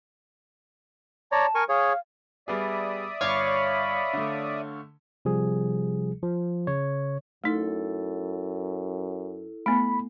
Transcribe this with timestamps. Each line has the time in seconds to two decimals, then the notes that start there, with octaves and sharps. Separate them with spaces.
1.32 C#5 D5 A5 A#5
1.55 A#4 G#5 C#6
1.69 G#4 C#5 F5
2.48 G3 B3 G#4 D5 E5 D#6
3.21 G1 C#5 F5 B5 C#6 D6
4.13 D3 A3
5.25 C3 F3 G3 G#4
6.23 F3
6.67 C#3 C#5
7.44 F#2 A3 D#4 E4 A4
9.66 A3 B3 B5